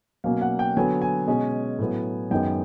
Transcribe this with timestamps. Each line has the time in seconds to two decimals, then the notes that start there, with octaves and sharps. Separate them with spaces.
0.24 B2 F#3 A#3 C#4 F5
0.41 F#5
0.59 G5
0.77 D3 F#3 B3 G#5
1.02 G#5
1.27 B2 G#3 C#4
1.79 A2 F#3 B3
2.31 F#2 D#3 G#3 B3 G5